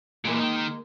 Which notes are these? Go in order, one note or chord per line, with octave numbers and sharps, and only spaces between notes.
A#2 E3 G#3 A#3
D#3 D#4